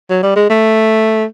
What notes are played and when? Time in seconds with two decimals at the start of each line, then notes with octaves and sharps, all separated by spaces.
0.10 F#3
0.23 G3
0.36 G#3
0.50 A3